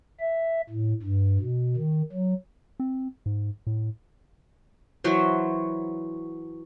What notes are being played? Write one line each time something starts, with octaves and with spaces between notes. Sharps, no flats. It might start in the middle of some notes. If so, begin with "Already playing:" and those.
E5
A2
G2
B2
D#3
F#3
C4
G#2
A2
E3 F#3 F#4 C5